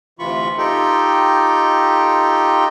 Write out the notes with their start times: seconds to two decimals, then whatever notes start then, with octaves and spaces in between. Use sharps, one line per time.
0.19 D2 C3 E3 F4 B5 C#6
0.58 D#4 F4 G4 A4 G5